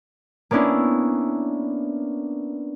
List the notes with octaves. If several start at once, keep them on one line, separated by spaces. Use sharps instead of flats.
A#3 B3 C#4 D4 E4